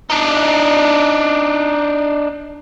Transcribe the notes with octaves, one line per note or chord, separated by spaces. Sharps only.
D4 D#4